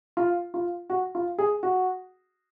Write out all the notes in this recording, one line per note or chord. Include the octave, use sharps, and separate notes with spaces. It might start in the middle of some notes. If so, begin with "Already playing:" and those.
F4
F4
F#4
F4
G#4
F#4